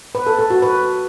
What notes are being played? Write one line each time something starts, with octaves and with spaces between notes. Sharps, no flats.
B4
A4
A4
F#4
B4